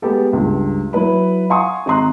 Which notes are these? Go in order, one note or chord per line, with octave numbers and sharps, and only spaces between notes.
G#3 A3 B3 G4 A4
C#2 G2
F#3 E4 B4 B5
F5 F#5 G#5 C6 C#6 D#6
G#1 A#5 C6 F#6